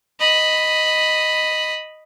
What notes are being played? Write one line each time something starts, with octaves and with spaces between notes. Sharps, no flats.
D#5 B5